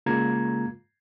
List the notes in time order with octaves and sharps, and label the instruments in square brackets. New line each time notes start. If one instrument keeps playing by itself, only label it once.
[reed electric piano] C#3 G#3 A#3 F4 A#5 G#6